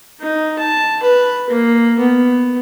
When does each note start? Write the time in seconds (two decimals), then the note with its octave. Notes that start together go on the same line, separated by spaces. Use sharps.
0.20 D#4
0.58 A5
1.03 B4
1.49 A#3
1.98 B3